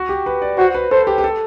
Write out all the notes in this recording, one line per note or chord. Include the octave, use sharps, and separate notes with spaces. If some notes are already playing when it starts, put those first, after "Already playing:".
Already playing: F#4
G4
B4
D5
F#4 C5
B4
A4 C5
G4
G4
A4